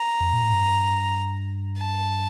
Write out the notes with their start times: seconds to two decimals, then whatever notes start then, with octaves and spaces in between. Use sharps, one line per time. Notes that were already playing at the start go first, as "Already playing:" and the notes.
Already playing: A#5
0.20 F2
0.33 A#2
0.43 A2
0.53 G2
1.78 A5